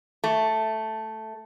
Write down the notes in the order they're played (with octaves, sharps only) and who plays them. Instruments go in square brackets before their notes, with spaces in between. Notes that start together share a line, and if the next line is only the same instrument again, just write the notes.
[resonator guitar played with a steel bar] A3